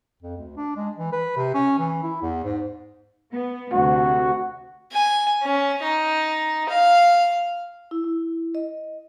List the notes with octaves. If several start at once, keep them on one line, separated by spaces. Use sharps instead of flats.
F2
D2
D4
G#3
E3
B4
C3
C#4
E3
E4
E2
G#2
B3
D2 C3 F#4
G#5
C#4
D#4
F5
E4
E4
D#5